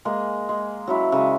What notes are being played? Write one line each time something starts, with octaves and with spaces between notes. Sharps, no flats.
G#3 A#3 G#4
G#3
F#3 C#4 E4
C#3 G#3